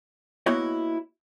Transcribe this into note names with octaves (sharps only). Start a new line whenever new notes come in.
A#3 B3 E4 F#4 C#5 D#5